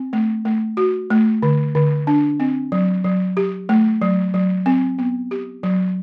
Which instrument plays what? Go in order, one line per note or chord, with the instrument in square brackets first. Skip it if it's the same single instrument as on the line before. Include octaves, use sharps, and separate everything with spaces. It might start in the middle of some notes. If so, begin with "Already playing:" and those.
Already playing: [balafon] C4
A3
A3
F#4
A3
D3
D3
D4
C4
F#3
F#3
G4
A3
F#3
F#3
C4
B3
G4
F#3